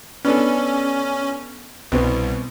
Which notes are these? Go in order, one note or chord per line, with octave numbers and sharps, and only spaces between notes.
B3 C#4 D4 A4
C2 B2 B3 C4